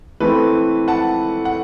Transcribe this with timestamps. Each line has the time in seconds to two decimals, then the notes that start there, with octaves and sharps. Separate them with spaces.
0.20 E3 A3 C4 B4
0.88 F#5 A5
1.45 F#5